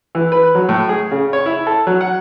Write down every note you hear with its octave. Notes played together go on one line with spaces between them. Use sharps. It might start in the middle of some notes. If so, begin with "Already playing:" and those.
E3
B4
F#3
A2
G#4
C#3
C#5
E4
A4
F#3
F#5